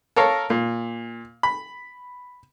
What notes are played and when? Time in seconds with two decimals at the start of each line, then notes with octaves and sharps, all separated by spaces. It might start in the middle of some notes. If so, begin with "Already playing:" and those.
0.16 A4 A#4 C#5 F5
0.50 A#2
1.43 B5